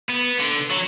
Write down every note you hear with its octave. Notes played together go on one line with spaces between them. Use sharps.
B3
D3
F#3